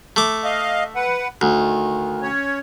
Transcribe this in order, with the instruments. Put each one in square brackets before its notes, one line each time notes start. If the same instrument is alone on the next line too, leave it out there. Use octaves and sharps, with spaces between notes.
[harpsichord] A3 D6
[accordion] D#5 F5
B4 F#5
[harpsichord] D2 [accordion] D#3
[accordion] C#4 C#5